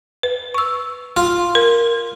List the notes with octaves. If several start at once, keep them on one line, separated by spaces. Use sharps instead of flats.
B4
C#6 E6
F4
A#4